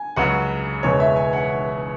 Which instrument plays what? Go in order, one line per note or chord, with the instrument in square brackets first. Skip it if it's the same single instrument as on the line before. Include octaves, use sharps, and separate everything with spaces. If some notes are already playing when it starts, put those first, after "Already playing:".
Already playing: [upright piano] G#5
[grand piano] C#2 C#3 F#3 [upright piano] F#5
[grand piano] E1 E2 C#3 G#3 C#4 [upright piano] C#5
[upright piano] E5
G#5
F#5